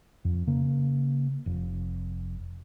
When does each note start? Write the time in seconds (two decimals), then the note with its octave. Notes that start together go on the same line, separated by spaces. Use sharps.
0.25 F2
0.47 C#3 A#3
1.46 F1